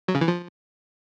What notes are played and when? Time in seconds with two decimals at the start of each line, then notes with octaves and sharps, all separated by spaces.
0.08 F#3
0.15 C#3
0.21 E3
0.28 F3